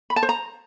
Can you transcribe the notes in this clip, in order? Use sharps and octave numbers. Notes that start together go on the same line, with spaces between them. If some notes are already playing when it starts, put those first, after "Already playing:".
B5
A5
C5
A#5